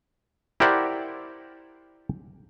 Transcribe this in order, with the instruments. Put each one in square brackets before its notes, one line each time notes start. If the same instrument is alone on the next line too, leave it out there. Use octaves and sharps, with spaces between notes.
[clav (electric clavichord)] E4 G4 A#4 C5 D5 F#5